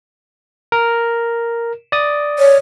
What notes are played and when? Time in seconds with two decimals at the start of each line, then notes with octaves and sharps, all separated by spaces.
0.72 A#4
1.92 D5 D#6
2.39 C#5